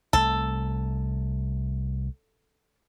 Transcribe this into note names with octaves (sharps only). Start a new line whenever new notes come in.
C2 A3 A4